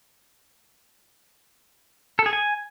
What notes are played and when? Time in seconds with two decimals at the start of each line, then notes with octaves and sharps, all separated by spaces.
2.19 A4
2.26 G#4
2.33 G#5